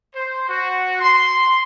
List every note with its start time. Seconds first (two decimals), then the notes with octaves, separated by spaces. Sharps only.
0.15 C5
0.49 F#4
1.00 C6